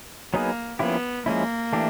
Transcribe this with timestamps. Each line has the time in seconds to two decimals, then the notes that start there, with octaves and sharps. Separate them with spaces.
0.34 F#3 A#3 B3 D#4 G#4 B4
0.79 F3 A#3 B3 C#4 E4 G4
1.26 F3 G#3 A#3 C#4 E4
1.73 E3 A3 D4 G4